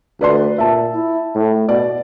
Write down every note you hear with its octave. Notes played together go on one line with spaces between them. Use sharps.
D2 B4 D5 C6
A#2 E5 A5
E4
A2
B2 D5